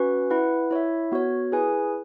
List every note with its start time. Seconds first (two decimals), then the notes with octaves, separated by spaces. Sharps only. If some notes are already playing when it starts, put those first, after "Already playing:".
Already playing: C#4 F#4 B4
0.30 E4 B4 F#5
0.71 E4 C#5 E5
1.12 B3 F#4 C#5
1.52 E4 G#4 B4 G#5